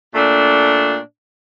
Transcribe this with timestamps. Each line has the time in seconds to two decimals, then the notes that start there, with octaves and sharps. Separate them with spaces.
0.13 A#2 A3 D4